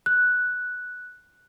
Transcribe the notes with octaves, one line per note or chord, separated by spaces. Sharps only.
F#6